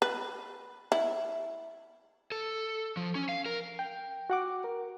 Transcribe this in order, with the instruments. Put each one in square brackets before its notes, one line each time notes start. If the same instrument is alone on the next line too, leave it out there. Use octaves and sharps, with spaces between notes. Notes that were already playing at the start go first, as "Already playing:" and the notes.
[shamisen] B4
E4
[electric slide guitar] A4
F3
C#4
F5
A#4
[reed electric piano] G5
F#4 F#5 D6
A#4